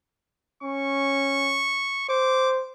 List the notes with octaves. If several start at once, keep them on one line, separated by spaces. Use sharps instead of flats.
C#4 C#6
C5 D6